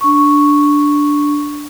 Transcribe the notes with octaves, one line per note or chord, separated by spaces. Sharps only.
D4 C#6